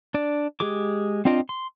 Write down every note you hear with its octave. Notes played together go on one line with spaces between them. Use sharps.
D4 D5
G#3 G4 G#4 D6
C4 D4 F4 D#5 G5
C6